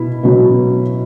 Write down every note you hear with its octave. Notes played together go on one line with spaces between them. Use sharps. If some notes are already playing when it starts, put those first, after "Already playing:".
Already playing: B2 E4
B2 F#3